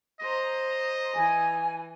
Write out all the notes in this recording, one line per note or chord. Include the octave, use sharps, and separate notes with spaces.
C5 D#5 A#5
E3 G#5